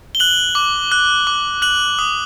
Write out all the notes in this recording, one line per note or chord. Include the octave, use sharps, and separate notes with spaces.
G7
F#6 F#7
D6
F#6
D6
F#6 F#7
D#6